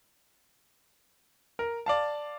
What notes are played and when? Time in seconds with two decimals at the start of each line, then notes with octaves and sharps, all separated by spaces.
1.59 A#4
1.86 D5 F5 A5